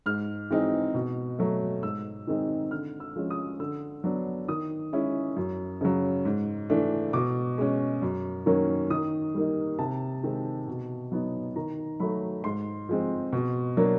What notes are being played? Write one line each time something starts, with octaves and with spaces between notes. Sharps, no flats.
G#2 F6
E3 G#3 C4 D#4
B2
F#3 A3
G#2 E6
D#3 G#3 C4 D#4
D3 F6
E6
F3 G#3 C#4
D#6
D3 E6
F#3 B3 D4
D#3 D#6
G#3 C#4 E4
F#2
C#3 F#3
G#2
E3 A3 D4
B2 D6
G#3 C#4
F#2
D#3 F#3 A#3 C#4
D#3 D#6
G3 A#3 D#4
C3 A5
D#3 G#3 C4
B2
F#3 B3 D#4
D#3 A#5
F#3 A3 B5
G#2 C6
F3 G#3 C4
B2
F#3 A#3 D4